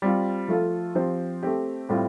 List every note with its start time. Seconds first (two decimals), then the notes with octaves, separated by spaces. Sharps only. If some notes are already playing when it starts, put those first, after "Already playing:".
0.02 G3 C4 F4
0.48 F3 A3 F4 A4
0.95 F3 C4 G4 C5
1.43 A3 C4 G4
1.89 A2 G3 C4 F4